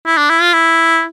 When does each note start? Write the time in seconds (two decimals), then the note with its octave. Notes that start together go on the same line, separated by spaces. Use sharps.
0.06 E4
0.17 D4
0.30 E4
0.41 F4
0.53 E4